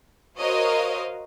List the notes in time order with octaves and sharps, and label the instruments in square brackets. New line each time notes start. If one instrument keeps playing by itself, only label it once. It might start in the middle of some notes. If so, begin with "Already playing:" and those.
[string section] F#4 A#4 C5 C#5 D#5 F5